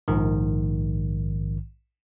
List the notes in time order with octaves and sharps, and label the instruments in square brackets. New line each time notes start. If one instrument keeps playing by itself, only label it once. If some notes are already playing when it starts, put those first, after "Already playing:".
[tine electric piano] A#1 G#2 D#3